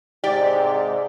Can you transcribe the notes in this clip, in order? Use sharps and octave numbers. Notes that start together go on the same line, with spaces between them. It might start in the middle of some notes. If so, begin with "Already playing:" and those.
G#2 C3 G4 D5